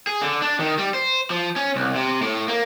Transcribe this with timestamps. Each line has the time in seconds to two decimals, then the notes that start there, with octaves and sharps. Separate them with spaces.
0.07 G#4
0.22 D3
0.42 D4
0.59 D#3
0.78 G3
0.94 C5
1.30 F3
1.56 C#4
1.76 C2
1.95 C3
2.22 A2
2.48 A#3